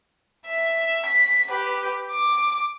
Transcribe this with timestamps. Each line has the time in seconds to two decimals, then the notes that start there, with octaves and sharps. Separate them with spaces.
0.46 E5
1.06 B6
1.50 G4 B4
2.10 D6